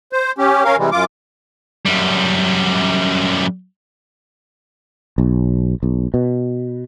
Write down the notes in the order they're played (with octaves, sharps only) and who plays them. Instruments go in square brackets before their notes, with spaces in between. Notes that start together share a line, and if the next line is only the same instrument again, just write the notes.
[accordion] C5
C#4 G4
C#4 A#4 F5
C3 E3 G3 G#3
F#2 F4 D6
[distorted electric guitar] F#2 G3
[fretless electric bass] B1
B1
B2